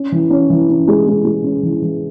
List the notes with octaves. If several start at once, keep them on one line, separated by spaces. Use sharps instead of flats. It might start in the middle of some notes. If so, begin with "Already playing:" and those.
Already playing: C#4
E3
C#4
E3
C#4
G#3
G#3
G#3
C#4
E3
E3